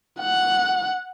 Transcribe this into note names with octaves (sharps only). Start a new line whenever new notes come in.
F#5